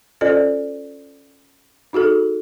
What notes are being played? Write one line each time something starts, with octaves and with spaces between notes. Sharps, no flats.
C#4 F4 A4 C5 D5 D#5
D#4 F#4 G#4 A4